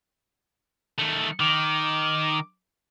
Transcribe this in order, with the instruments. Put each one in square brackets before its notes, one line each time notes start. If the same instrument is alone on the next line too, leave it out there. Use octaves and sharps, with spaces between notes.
[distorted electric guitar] D#3 A3
[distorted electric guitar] D#3 [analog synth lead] D6